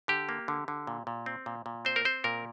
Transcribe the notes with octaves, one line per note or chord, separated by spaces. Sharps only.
D3 G4
A#3
D3
D3
A#2
A#2
C4
A#2
A#2
C4 C5
A#4
C4 C5
A#2 A#4